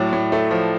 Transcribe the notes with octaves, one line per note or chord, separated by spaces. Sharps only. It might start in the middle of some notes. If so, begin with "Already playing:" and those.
Already playing: A2 F#3 D5
A2
A3
F3